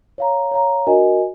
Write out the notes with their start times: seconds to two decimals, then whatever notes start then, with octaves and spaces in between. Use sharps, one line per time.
0.18 C#5 F5 A#5
0.51 C#5 F5 A#5
0.87 D4 F#4 A#4 D#5 G#5